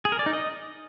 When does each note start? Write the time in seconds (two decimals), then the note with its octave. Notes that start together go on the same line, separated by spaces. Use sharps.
0.05 G#4
0.12 A#4
0.19 D5
0.26 D#4
0.33 D#5